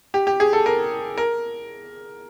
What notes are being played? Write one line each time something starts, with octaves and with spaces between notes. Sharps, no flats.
G4
G4
G#4
A4
A#4
A#4